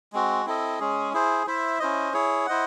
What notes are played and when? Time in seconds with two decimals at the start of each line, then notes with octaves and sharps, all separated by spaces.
0.13 G#3 C4 F#4
0.45 C4 E4 A4 D#5
0.80 G#3 C#4 G#4
1.13 E4 G#4 C5
1.47 E4 C5 E5
1.79 C#4 E4 C5 D#5
2.13 E4 G#4 C#5
2.46 E4 C5 D#5 F#5